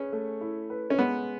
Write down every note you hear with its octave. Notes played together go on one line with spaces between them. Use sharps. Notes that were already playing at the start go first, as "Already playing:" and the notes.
Already playing: C#4 G#4 B4
A3
E4
B4
C#4
G#3 B3